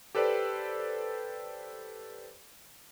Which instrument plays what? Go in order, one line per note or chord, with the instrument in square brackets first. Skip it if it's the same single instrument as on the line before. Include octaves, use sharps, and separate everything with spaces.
[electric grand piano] G4 A4 B4 C5 D5